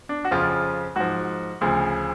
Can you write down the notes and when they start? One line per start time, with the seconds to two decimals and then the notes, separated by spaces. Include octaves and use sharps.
0.09 D4
0.24 F#4
0.31 F2 C#3 F3 F4
0.96 G#2 F3 F#4
1.61 D2 C#3 F3